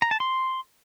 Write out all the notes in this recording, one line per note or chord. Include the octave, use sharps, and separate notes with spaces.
A#5
A5
C6